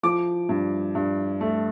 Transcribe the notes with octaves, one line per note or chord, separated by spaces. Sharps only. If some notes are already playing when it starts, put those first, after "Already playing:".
F3 D6
G2
G2
A3